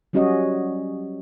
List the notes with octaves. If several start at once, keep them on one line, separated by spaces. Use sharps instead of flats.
F#3 G3 C#4 F#4 C#5 D#5